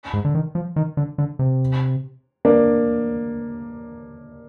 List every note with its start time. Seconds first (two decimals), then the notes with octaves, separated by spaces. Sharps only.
0.13 G#2
0.25 D3
0.35 D#3
0.55 F3
0.76 D#3
0.97 D3
1.18 D3
1.39 C3
2.45 A#3 D4